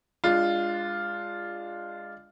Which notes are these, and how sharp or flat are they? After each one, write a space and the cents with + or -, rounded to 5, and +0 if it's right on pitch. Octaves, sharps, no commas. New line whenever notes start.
G#3 -20 D4 +0 F4 +0